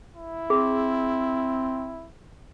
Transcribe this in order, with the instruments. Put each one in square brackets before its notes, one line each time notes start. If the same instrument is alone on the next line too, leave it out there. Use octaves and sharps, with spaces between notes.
[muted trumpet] E4
[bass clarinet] C4 [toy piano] G#4